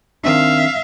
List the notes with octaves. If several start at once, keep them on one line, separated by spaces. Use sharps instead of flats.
D#3 C4 D4 E5 F5